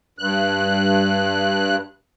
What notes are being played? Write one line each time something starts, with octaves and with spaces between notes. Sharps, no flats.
G2 F#6